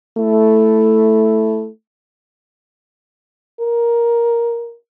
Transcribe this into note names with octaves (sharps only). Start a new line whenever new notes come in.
A3 E4
A#4